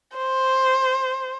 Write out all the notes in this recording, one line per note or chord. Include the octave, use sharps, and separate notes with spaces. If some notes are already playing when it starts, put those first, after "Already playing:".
C5